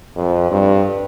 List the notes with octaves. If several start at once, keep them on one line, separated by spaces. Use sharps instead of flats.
F2
G2